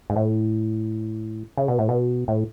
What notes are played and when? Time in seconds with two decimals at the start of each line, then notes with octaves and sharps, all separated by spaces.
0.10 G#2
0.16 A2
1.57 C#3
1.68 B2
1.78 A2
1.89 B2
2.28 A2